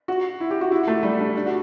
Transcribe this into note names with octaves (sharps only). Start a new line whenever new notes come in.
F#4
E4
G4
F#4
E4
A3
G3
D4
D4
F#4